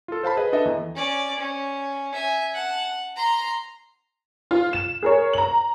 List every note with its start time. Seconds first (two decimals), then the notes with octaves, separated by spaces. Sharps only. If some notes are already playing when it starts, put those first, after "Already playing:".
0.08 F4 A4
0.23 C5 F5 A5 B5
0.37 G#4 B4 D#5
0.52 D4 A4 B4 D#5 E5
0.65 E2
0.96 C#4 D5
1.39 C#4
2.13 E5 G#5
2.54 F#5 A5
3.16 A#5 C6
4.51 F4
4.73 E7
5.03 G#4 A#4 C#5
5.33 A#5 F#7